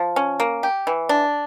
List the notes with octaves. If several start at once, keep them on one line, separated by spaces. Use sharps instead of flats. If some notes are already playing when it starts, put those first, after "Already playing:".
Already playing: F3
C#4
A#3
G4
E3
D4